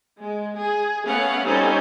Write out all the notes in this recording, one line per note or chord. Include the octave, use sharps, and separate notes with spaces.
G#3
G#4
A3 B3 C#4 F5 F#5
G3 C4 C#4 D#4 A4 C5